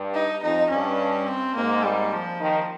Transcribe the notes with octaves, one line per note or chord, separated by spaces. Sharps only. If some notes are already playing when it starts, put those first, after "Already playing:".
Already playing: G2
D#4
F2 D#4
G2 C#4
C4
G#2 A#3
G3
F3
D#3